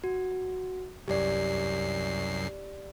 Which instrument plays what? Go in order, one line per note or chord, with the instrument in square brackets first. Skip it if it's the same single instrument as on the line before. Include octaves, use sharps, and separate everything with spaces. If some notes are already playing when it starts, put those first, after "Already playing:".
[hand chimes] F#4
[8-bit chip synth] C2 F#2 C7 [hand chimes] G4 D5